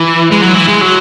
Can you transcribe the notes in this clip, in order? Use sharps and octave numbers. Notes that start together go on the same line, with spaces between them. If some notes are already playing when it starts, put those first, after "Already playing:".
Already playing: E3
G#3
F#3
E3
G#3
F#3